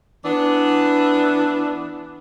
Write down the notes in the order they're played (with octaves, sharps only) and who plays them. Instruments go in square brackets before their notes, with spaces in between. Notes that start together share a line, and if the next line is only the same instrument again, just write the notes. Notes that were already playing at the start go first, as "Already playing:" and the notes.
[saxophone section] E3 B3 D4